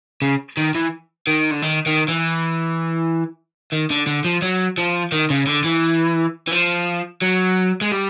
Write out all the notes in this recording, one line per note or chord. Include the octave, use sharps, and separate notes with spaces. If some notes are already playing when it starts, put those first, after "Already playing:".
C#3
D#3
E3
D#3
D3
D#3
D#3
E3
D#3
D3
D3
F3
F#3
F3
D#3
C#3
D3
E3
E3
F3
F#3
G#3
G3